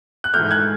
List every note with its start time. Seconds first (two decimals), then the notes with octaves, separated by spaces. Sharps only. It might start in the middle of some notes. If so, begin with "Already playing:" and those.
0.24 F#6
0.34 G#2 E3 A3 F6 G6
0.51 F#6 G#6